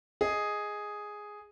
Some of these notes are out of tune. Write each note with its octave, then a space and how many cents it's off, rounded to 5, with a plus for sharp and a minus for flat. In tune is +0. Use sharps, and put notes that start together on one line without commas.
G#4 +0 D#5 +0